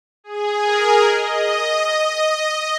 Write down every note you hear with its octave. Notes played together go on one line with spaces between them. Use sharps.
G#4
A#4
D#5